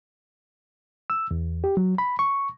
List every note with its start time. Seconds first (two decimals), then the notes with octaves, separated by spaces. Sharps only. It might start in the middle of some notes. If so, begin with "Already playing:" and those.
1.10 E6
1.31 E2
1.64 G4
1.77 F#3
1.98 B5
2.19 C#6